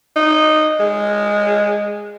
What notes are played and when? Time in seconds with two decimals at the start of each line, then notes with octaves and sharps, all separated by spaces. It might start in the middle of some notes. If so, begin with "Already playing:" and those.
0.16 D#4
0.80 G#3